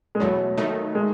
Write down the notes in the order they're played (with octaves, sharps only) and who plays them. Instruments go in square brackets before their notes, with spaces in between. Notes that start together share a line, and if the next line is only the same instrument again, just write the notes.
[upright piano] G#3
[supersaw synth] E2 B2 A3 [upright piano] F#3
[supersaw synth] D#2 D#3 A3 D#4
[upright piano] G#3